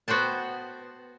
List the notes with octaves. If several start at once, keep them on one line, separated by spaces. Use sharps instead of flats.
B3 F#4 C5 G5 A5